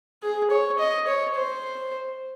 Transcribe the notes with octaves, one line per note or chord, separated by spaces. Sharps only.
G#4
C#5
D#5
C#5
C5